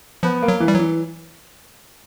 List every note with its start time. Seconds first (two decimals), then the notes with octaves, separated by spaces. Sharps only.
0.23 F3 B3
0.42 A#3
0.48 F#3
0.60 E3
0.68 G3
0.74 F#3
0.79 E3